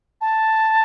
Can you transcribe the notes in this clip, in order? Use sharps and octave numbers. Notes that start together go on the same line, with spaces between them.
A5